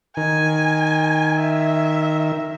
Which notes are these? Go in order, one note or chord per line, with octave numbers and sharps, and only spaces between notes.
D#3 G#5
E5